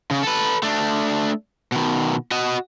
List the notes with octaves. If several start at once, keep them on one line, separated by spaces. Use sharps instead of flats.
C#3
A4 B4
A3 D4
B2 D#3
F#4 D#5